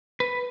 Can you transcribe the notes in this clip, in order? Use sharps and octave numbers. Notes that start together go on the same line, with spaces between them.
B4